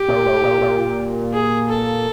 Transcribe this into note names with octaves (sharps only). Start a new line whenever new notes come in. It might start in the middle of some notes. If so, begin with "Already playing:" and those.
Already playing: G4
A#2
A2
A#2
A#2
G#4
A4